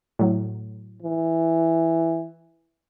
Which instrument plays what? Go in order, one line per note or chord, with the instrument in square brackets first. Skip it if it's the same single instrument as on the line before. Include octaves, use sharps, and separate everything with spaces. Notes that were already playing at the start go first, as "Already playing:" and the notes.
[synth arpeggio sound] A2 F#3
[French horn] E3